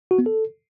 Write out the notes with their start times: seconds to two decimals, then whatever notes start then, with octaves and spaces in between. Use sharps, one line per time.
0.11 F#4
0.19 B3
0.26 A4